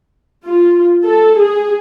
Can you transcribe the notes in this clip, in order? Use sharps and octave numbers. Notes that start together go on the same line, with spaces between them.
F4
A4
G#4